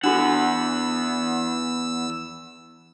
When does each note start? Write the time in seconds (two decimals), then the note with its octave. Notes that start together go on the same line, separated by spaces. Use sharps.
0.04 E2 D4 F#4 A4 F#5 E6